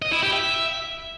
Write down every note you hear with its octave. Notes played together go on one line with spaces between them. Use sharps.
D#5
E4
G4
E5